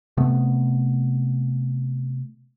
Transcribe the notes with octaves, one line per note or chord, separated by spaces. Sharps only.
C3 A3 B3